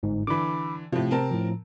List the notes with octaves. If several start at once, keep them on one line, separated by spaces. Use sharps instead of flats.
G1 G#2
D3 E3 B5 D6
A2 C3 F3
C4 A#4 A5
A2 F3